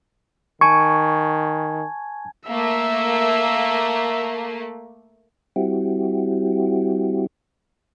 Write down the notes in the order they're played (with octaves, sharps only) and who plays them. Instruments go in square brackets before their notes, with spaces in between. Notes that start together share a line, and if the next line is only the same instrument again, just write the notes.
[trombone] D#3 [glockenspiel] G#5 A5 G#6 [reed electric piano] C#6
[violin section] A3 A#3 [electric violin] E5
[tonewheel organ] G3 C4 E4 F#4 G4